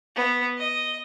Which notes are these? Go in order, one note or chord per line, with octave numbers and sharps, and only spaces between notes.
B3
D#5